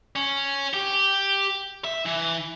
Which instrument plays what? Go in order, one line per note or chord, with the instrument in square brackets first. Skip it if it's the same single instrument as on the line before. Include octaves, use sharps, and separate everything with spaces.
[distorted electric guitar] C#4
G4
E5
E3